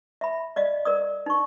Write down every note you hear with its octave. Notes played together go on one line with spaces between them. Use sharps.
E5 B5
D5 D#5 F5
A#4 D5 D#6
D#4 C#6